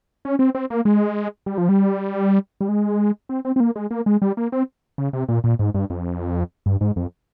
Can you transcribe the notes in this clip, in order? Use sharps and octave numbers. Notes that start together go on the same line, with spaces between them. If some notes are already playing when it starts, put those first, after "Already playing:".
C#4
C4
C4
A#3
G#3
G3
F3
G3
G3
G#3
C4
C4
C4
A#3
G#3
A#3
G#3
G3
A#3
C4
C#3
C3
A#2
A#2
G#2
G2
F2
G2
G#2
F2